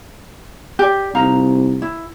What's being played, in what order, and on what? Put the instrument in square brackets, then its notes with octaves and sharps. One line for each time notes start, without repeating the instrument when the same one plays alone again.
[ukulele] G4 D5
[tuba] C2 [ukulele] D#4 F5 A#5
[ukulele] E4